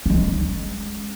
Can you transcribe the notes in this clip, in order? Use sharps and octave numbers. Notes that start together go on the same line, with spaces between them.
G#3 C#4